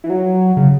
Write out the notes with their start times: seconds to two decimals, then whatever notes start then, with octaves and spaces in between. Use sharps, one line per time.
0.04 E3
0.10 F#3
0.57 C#3